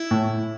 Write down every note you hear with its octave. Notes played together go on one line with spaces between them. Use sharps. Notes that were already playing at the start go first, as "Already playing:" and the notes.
Already playing: E4
A2